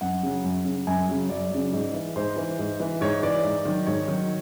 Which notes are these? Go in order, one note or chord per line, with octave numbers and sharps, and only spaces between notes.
F#2 F#5
C#3 F#3
F#2
C#3 F#3
F#2 G#5
C#3 F#3
F#2 D5
C#3 F#3
G#2
E3
G#2 C5
E3
G#2
E3
G#2 C#5
E3 D5
G#2
D#3 F#3
G#2 C#5
D#3 F#3